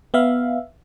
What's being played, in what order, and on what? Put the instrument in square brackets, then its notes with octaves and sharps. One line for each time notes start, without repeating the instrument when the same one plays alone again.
[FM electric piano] B3 E5 F5